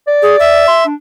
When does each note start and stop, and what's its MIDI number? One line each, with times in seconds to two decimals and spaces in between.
0.08 0.67 74
0.22 0.36 68
0.40 0.85 76
0.68 0.82 84
0.86 0.94 62